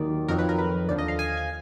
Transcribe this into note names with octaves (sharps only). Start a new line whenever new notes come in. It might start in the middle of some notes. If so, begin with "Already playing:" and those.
Already playing: D#2 D#3 F#3 D5
F2 D#3 F#3 A#4
B4
A#4
B4
D#2 D3 F3 D5
D#5
F5
G#5
G#5